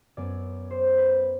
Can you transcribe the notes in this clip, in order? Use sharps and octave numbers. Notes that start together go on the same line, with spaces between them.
F#2 F#3 B3 D5
C5
B4